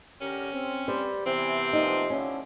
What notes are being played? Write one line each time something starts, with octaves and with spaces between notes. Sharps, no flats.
D3 C#4 G4 A#4
C4
G3 C5
C3 E3 B3 C4
A#2 F3 B3 D#4
D3 F3 C#4 E4